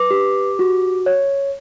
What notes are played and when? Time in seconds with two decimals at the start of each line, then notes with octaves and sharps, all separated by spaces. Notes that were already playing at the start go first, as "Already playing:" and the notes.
Already playing: B4 D6
0.11 G4
0.59 F#4
1.06 C#5